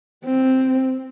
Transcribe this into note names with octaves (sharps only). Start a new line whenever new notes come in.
C4